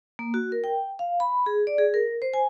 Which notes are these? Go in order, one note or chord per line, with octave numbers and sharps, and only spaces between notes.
A#3
F#4
A#4
G5
F5
B5
G#4
D5
G#4
A#4
C5
G#5